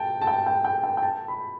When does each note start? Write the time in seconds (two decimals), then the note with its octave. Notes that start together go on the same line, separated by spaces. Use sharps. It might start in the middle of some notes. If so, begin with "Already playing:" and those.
Already playing: G5 A5
0.21 A5
0.27 G5
0.46 G5
0.65 G5
0.84 G5
0.97 G5
1.03 A5
1.28 B5